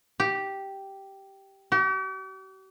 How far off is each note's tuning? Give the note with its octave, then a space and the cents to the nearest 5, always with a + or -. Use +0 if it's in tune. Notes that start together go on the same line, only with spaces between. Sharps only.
G4 -5
G4 -45